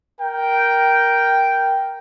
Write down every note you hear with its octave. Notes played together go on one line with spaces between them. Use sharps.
A#4 G5